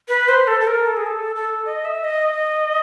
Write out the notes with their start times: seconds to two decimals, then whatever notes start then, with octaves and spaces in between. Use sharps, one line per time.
0.08 B4
0.29 C5
0.47 A4
0.61 A4
0.67 A#4
0.87 A4
0.97 G#4
1.06 A4
1.36 A4
1.66 D#5
1.85 E5
2.04 D#5